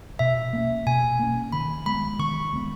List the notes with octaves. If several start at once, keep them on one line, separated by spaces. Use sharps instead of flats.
B2 E5
A#3 C#4
B2 G#5
A#3 C#4
D#3 B5
G#3 B3 B5
D#3 C#6
G#3 B3